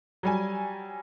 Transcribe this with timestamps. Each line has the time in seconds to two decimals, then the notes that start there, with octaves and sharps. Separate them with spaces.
0.23 F#3 G3 G#5